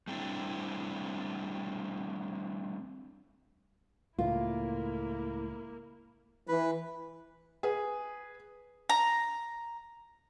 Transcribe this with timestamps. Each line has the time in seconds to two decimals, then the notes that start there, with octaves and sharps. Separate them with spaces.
0.07 G3 A3 C4 D4 E4
4.18 C#2 A2 A#3 E4 F4
6.48 E3 B4
7.63 G#4 B4
8.90 A#5